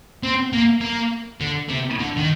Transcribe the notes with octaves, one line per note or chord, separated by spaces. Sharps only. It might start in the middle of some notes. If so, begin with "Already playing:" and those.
C4
A#3
A#3
D3
C3
D3
D#3